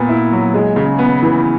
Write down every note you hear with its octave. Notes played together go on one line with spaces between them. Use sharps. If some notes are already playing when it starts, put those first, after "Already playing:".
Already playing: A#2 B3
E4
F#3
G#3
C#3
B3
E3